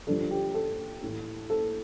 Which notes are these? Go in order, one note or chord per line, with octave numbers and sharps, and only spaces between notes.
G2 D3 F3 A4
G4
A4
A2 E3
A4